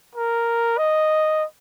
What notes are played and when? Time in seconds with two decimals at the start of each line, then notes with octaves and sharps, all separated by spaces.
0.15 A#4
0.78 D#5